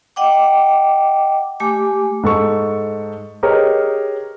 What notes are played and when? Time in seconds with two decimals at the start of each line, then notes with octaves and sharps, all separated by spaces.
0.16 D#5 F#5 G5 D6
1.60 A3 G4 G#5 D6
2.23 G#2 A4 C#6
3.43 G4 G#4 A#4 B4 C#5 D#5